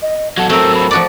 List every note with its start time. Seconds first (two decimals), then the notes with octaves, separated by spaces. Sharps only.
0.02 D#5
0.38 F#3 A4 F#5
0.50 F#3 A3 C4 A#4 E6
0.75 B5
0.91 F3 F#4 D5 D6